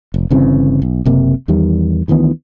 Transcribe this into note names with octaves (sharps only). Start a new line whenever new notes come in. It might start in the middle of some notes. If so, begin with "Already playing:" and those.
F1
G1 C#3 E3 C4
B1
F#1 C3 A#3
E2 D#3 G3
D2 D#3 E3 B3